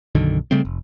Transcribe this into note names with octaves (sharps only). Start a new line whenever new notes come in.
B1 F#2 D3 D#3
C#3 G3 A3 C4
F1